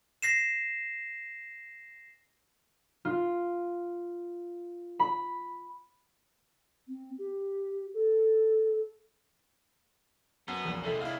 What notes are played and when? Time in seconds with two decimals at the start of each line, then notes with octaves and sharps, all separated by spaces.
0.22 A#6 C7 E7
3.05 F4
5.00 B5
6.87 C4
7.18 G4
7.94 A4
10.48 F#2 B3 A5 G7
10.65 A#1 E2
10.84 C3 G#3 A3 E4 A4
11.01 E4 F5 E6 F6